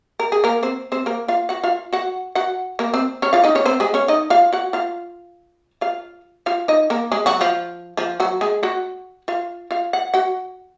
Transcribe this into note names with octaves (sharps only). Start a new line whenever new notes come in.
A#4
G#4
A#3 A#4
C4 C5
C4 C5
A#3 A#4
F4 F5
F#4 F#5
F4 F5
F#4 F#5
F#4 F#5
A#3 A#4
C4 C5
C#4 C#5
F4 F5
D#4 D#5
C#4 C#5
C4 C5
G#3 G#4
C#4 C#5
D#4 D#5
F4 F5
F#4 F#5
F4 F5
F4 F5
F4 F5
D#4 D#5
A#3 A#4
G#3 G#4
F#3 F#4
F3 F4
F3 F4
F#3 F#4
G#3 G#4
F#4 F#5
F4 F5
F4 F5
F#5
F#4 F#5